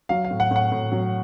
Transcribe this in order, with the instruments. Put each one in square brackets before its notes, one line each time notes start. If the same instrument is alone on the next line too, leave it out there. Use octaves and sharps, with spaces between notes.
[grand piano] F#3 F5
F5
A2
F#5
A2 F#5
A2
F#3